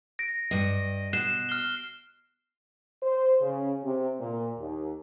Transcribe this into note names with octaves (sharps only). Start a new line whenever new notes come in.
A#6 D7
G2 D#5
B2 F#6 C7 E7
F6 C7 G7
C5
C#3
C3
A#2
D#2